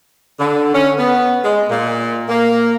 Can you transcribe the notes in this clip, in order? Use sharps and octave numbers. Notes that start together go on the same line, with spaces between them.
D3
C#4
B3
G#3
A#2
A#3